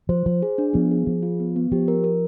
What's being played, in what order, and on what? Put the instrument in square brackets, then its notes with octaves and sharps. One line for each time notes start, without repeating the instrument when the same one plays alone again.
[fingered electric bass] F3 [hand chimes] C5
[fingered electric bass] F3 [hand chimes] C5
[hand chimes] G#4
D4
[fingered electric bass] F3 [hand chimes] B3
[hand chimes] G#4
[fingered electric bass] F3 [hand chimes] G#4
[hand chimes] F4
B3
B3
[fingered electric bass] F3 [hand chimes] G4
[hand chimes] A#4
A#4